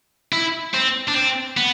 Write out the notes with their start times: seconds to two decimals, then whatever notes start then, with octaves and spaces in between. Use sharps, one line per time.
0.33 E4
0.74 C4
1.09 D4
1.15 C4
1.57 B3